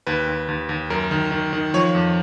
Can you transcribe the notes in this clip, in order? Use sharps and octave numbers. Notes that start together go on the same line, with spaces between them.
D#2 B4
D#2
D#2
D#2
F#2 A#4
D#3
D#3
D#3
F3 C#5
F2